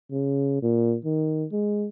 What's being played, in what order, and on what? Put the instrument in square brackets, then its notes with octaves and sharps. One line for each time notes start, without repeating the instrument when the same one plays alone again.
[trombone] C#3
A#2
D#3
G#3